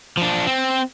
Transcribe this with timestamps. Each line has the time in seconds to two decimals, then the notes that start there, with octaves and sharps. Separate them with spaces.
0.17 F3 D4
0.47 C4